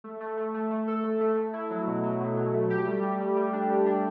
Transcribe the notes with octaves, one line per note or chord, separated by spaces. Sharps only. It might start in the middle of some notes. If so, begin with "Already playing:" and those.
A3
A3
A3
A3
A3
A4
A3
A3
A3
E4
F#3
B2
F#3
B2
F#3
A3
G4
G3
G3
G3
G3
D4
G3
D4